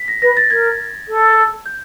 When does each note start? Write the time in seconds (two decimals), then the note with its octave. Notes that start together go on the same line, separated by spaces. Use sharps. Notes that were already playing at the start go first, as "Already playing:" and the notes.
Already playing: B6
0.08 A#6
0.22 B4 A#6
0.37 A6
0.50 A#4 G#6
1.08 A4
1.66 G6